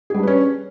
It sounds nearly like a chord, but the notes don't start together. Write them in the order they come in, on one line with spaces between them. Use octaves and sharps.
G#4 G3 D4 B4 C#4